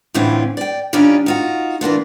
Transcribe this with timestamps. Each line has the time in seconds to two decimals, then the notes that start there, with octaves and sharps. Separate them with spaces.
0.14 A2 D3 E3 C4 C#4 F4
0.57 D5 G5
0.93 D#3 G3 C#4 D4 F4
1.26 D#4 F4 F#4
1.81 E3 A#3 D4 F4